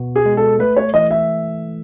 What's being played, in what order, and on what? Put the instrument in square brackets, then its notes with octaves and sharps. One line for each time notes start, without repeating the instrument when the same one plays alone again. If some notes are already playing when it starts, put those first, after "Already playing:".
Already playing: [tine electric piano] B2 B3 F#4
[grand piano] G#4
[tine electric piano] G#3
[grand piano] A4
[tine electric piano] A3 [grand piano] B4
[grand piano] C#5
[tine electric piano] E3 [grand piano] D#5
[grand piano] E5